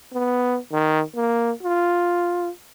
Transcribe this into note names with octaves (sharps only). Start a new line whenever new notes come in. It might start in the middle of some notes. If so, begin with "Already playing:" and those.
B3
D#3
A#3
F4